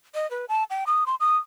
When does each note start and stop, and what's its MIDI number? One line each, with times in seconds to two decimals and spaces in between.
0.15 0.29 75
0.31 0.45 71
0.49 0.64 81
0.70 0.84 79
0.87 1.04 87
1.06 1.15 84
1.20 1.37 87